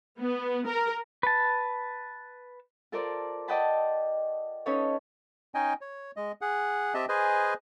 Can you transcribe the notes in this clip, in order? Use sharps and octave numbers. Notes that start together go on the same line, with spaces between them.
B3
A#4
B4 A5
F4 A4 A#4 C5 D5
D5 D#5 F#5 G5 A5 B5
C#4 D#4 A4 B4 C#5 F5
C#4 D#4 D#5 G5 G#5
C#5
G#3 D#5
G#4 F#5
C4 G4 D#5 E5 A5
G#4 B4 C5 D#5 G#5